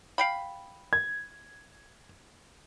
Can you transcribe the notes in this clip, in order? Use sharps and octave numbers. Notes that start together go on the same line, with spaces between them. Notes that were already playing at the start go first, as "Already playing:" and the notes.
F5 G5 B5
G#6